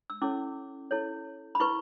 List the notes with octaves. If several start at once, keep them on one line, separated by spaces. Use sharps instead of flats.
E6
C#4 E4 A4 C#5 D6
E4 A4 C#5
B5
E4 B4 C#6